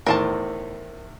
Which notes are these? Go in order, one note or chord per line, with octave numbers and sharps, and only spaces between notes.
E2 A2 D#3 A#4 C5 A5